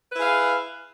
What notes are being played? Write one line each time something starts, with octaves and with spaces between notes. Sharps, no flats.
E4 G#4 B4 F5